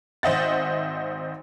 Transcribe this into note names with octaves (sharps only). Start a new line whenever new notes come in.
G#1 C5 D#5 E5 F#5 A6